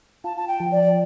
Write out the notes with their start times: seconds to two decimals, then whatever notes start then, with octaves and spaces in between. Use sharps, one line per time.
0.24 F4 A5
0.37 A5
0.48 G5
0.60 F3
0.72 D5